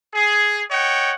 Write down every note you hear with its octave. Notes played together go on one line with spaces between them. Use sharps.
G#4
C#5 D#5 F#5 G5